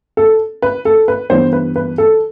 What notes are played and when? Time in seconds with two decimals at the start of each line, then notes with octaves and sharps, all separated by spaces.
0.17 A4
0.62 B4
0.85 A4
1.08 B4
1.30 G2 E3 B3 C5
1.53 B4
1.76 B4
1.98 A4